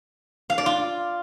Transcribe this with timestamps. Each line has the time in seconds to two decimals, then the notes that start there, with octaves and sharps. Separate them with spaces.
0.50 F5
0.58 D5
0.66 F4